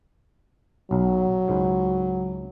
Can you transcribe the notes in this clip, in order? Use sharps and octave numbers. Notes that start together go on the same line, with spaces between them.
B1 F#3
C#2 G#2